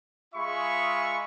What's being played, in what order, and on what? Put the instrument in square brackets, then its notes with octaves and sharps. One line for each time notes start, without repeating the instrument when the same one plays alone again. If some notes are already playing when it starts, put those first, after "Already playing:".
[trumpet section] G#3 F4 G#4 E5 B5 C#6